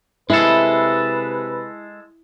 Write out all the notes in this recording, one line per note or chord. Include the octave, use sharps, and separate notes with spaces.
C3 G#3 E4 A4 B4